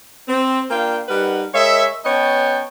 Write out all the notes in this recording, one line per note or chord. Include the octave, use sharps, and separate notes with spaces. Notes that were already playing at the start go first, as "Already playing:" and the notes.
C4
A#3 D4 F4 F5 G5
G3 D#4 A#4 B4 F#5
G#3 A#4 C#5 D#5 E5
B3 C#4 C#5 D#5 G5 A5